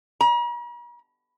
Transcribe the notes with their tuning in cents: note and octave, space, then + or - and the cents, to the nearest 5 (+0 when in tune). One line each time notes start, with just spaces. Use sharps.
A#5 +45